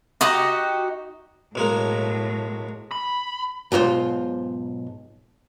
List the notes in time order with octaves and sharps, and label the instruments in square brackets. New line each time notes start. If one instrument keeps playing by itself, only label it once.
[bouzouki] D#4 F#4 G4 D#5
[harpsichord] B1 G#3 A#3 [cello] A2
[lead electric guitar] B5
[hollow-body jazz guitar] B1 G#2 F4 C5